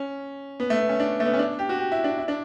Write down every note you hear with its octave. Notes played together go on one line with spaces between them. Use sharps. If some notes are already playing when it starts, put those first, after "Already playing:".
Already playing: C#4
B3
A3
B3
C#4
D4
A3
B3
C#4
D4
G4
F#4
G4
E4
D4
E4
D4